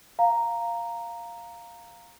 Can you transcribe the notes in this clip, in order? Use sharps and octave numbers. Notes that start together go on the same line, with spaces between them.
F5 A#5